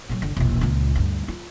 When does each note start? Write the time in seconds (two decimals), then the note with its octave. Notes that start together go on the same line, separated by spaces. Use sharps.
0.09 A#2 F#3
0.22 G1 D3
0.37 E1 A#1
0.61 C#2 A#2
0.96 D2 G2
1.28 F4